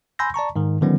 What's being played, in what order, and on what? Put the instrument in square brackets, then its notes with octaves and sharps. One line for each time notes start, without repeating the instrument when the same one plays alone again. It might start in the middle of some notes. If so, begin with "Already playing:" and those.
[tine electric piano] G#5 B5 C6 E6 G6 A#6
D5 A5 A#5 C#6
G#2 D#3
D3 D#3 F3 G3 B3 C#4